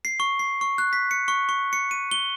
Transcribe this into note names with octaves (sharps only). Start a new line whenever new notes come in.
C7
C#6
C7
C#6
F#6
B6
C#7
C#6
C#6
C#7
D#7
G7